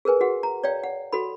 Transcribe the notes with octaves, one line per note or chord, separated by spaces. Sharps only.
G#4 A#4 B4 G#5
F#4 G#4 F#5
A#5
C#5 D5 F5 G5
F#5
F#4 A4 B5